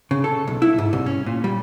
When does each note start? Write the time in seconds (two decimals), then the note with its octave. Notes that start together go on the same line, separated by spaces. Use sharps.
0.11 C#3
0.24 A4
0.48 B1
0.62 E4
0.78 G#2
0.93 C2
1.06 C#4
1.26 A#2
1.44 G3